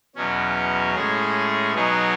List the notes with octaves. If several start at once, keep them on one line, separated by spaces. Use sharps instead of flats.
E2 B2 F#3 C#4
A2 G#3 C#4 G#4
B2 F#3 B3 D#4 G#4